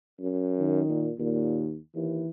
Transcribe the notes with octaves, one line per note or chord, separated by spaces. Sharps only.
F#2
D#3
A#2
D#2 A#2
D#2 E3